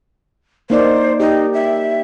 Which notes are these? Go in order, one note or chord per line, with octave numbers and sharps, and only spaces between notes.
A#3 D#4 C5 D5
D#4 G4
E5